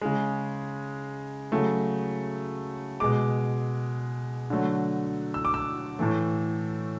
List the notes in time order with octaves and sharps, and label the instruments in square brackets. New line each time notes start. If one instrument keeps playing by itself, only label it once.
[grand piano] C#3 G#3
C#3 F#3 A3
B2 G#3 D6
D3 F#3 A3
E6
D6
E6
A2 E3 A3